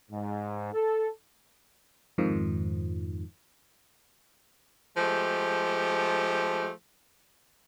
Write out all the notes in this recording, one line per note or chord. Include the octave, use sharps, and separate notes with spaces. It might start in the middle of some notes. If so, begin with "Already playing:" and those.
G#2
A4
F2 G#2 D#3 F3
F3 G#3 A3 G4